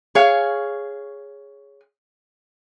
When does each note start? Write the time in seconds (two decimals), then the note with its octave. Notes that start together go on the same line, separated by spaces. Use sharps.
0.15 G#4 C#5 F5